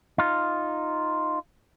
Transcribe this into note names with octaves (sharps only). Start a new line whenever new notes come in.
D#4 F4